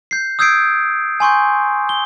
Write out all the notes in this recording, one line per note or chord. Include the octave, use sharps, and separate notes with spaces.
G6 C7
D#6 E6 G6 G#6 C7 D7
G#5 C6 C#6 G6
G7